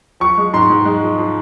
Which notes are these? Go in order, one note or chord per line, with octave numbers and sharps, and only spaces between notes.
F3 C#6
G#3
G#2 C6
G#2
G#3
F3
F3